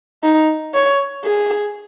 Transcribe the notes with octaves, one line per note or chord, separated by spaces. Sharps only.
D#4
C#5
G#4